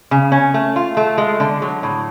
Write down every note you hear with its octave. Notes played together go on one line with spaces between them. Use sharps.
C#3
C#4
A3
F4
A3
G#3
D3
F#3
A2